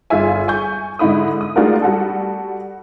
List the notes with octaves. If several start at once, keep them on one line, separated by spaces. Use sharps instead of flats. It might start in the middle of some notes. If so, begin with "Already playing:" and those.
G1 F4 G#4 E5 G#5
G#5 C#6 G6
G#2 D3 D#4 E4 B5 D#6
D#6
G#3 A3 D4 F4 F#4 A#4
G3 F#4 A4